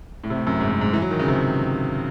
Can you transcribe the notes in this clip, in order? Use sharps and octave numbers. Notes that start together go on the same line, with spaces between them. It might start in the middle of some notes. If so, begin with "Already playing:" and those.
A2
C3
A2
F#2
G#2
F#2
G#2
E3
F#3
D#3
C#3
C3